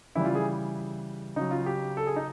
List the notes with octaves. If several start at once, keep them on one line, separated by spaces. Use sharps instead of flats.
C#3 E3 G3 E4
F4
G#4
C#3 F#3 D#4
F4
G4
A4
G#4
D#4